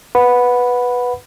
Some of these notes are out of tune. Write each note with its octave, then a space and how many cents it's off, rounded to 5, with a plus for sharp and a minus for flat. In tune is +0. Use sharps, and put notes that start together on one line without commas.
B4 +0 F#5 -15 B5 +0